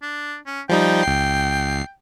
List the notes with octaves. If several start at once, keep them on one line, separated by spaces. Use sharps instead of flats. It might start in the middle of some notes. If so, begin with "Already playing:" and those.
D4
C#4
F3 G3 D#4 G5
C#2 C7